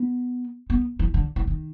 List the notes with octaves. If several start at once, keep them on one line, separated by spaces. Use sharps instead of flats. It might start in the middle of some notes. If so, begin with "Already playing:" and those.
Already playing: B3
B3
E3
D3
E3
D#3